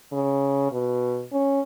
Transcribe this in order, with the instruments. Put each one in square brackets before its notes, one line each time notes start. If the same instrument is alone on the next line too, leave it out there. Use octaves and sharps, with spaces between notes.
[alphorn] C#3
B2
C#4